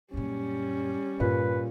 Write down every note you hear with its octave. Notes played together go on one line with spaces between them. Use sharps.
F#2 A#2 G3 C#4
G2 A#2 D#3 B4